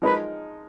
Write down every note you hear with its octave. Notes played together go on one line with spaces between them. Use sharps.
F3 G#3 D#4 A#4 B4